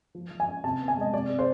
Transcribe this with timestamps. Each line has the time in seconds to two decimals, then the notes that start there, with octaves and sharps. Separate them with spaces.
0.15 F3
0.31 F3
0.40 G#5
0.47 C#4
0.64 C3 A5
0.81 B3
0.88 G#5
0.97 G#3 D#5
1.13 C3 D5
1.29 C3
1.39 C5